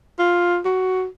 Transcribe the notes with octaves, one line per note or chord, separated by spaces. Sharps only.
F4
F#4